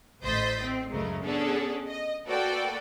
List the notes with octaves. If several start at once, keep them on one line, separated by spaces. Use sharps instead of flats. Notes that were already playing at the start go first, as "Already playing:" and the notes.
A1 C5 D#5 G6 A6 B6
C4
C#2 F#2 C#3 G#3 A3 A#4
B3 C#4 D4 G#4 A4
D#5
A#3 F#4 A4 B4 D5 G5